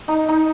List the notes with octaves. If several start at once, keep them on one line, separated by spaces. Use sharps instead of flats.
D#4
D#4